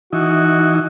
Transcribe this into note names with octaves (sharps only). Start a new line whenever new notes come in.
E3 D#4 F#4